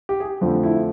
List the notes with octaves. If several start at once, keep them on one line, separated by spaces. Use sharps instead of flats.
G4
G#4
G4
F2 D3 F3 A3
E4